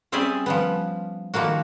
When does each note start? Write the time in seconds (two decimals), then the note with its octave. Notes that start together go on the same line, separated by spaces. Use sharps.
0.12 G3 C4 C#4 G#4 D5 E5
0.46 F3 G3 B3
1.34 D#3 F3 G3 A#3 F#4